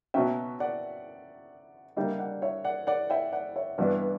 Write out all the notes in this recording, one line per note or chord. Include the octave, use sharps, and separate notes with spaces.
B2 F#3 C#4 E5 G5
D5 F#5
D3 G3 A#3 D4 E5 G5
D5 F#5
C#5 E5
D5 F#5
D5 F#5
E5 G5
D5 F#5
C#5 E5
G2 E3 B3 D4 D5 F#5